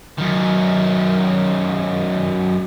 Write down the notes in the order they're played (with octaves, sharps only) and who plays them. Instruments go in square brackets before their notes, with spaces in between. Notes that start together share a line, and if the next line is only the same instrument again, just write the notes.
[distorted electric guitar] F#2 D#3